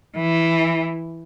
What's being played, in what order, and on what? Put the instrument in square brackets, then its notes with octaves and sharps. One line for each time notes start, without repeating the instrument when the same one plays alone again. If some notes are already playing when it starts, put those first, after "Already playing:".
[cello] E3